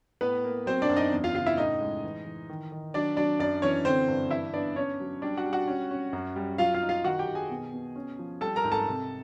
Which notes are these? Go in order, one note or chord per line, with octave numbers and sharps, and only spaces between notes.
A2 B3 B4
A#3
F#3 C4 C5
D4 D5
F#2
D#4 D#5
E2
F4 F5
C#3 F4 F5
E4 E5
A2 D#4 D#5
G#3
E3
E3
D#3
D#3
F#3 D4 D5
F#3 D4 D5
F#2 D4 D5
E3 C#4 C#5
D3 C4 C5
G2
E3 E4 E5
B3 D4 D5
C#4 D4 C#5
F#3
G3 D4 D5
F#4 F#5
G3
F#4 F#5
C#4
C#4
F#2
G3
F#3 F4 F5
F4 F5
D#4
F4 F5
D#3 F#4 F#5
G4 G5
D#3
G#4 G#5
B2
B2
C#4
F3
G3 A4 A5
A#4 A#5
G#2
A4 A5
C3